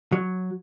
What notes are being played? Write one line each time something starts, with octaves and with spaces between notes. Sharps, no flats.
F#3